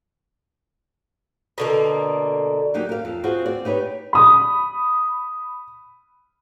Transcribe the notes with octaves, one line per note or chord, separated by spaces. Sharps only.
B2 D3 A#3
F#3 A#3 D#4 G4
A#4 F5
F2 A5
C4 F4 F#4 G#4 C5
C4 D5
D#4 G4 B4 C#5
B5 D#6